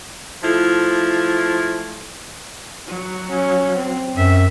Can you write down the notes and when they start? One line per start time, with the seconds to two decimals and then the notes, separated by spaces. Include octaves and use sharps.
0.42 F3 A3 E4 F4
2.87 F#3
3.30 C#4
3.77 C4
4.16 F#2 E5